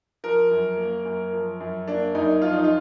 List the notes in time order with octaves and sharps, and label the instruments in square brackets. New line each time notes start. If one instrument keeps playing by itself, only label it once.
[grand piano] F3 A#4
F#2
A#3
F#2
F3
F#2
A#3 D4
F#2 D#4
F3 F4
D#4
F4